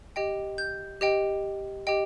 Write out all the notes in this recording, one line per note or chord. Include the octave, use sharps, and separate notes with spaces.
G4 D#5 G5
G6
G4 D#5 G5
G4 D#5 G5